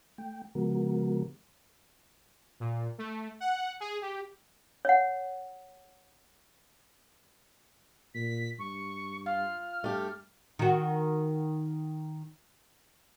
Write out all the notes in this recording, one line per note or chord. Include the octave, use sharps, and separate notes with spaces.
A3 G5
C#3 F3 G#3 B3 F#4 A#4
A#2
A3
F#5
G#4
G4
C#5 F#5
A#2 B6
G2 C#6
F4 F6
G2 A3 G4
D#3 F#4